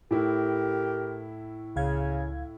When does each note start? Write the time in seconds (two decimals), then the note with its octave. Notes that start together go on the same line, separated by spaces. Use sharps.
0.11 A2 E4 G4 A#4
1.76 C#2 C#3 F5 G#6